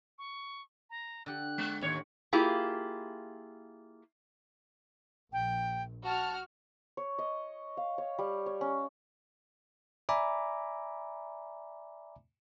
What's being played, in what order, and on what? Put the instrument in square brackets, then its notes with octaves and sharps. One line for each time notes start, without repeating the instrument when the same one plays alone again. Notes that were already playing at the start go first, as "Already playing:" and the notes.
[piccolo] C#6
A#5
[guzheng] D3 G4 F#5 [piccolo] F#6
[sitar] G#3
[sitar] D#2 C#5 [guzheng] A2 F#5
[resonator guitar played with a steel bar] A#3 E4 F4 G4 G#4
[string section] A#1 [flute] G5
[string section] F#4 F6 [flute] A5
[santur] C#5
D#5
F5
C#5
G3
C#5
C#4
[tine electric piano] D5 E5 G#5 A#5 B5 D6